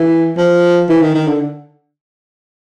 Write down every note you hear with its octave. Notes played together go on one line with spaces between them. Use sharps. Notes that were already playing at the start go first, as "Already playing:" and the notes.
Already playing: E3
F3
E3
D#3
D#3
D3